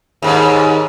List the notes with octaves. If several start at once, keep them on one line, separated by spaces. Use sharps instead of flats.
D#2 G#2